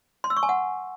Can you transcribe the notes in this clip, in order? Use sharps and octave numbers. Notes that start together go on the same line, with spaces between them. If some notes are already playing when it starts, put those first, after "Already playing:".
C6
E6
C#6
G#5
F#5